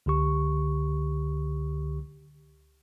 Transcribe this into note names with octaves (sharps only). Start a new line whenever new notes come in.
C#2 D3 G4 C#6